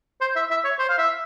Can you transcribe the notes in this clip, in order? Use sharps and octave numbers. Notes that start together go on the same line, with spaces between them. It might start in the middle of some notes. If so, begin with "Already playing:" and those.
C5
E5
E5
C#5
C5
F5
E5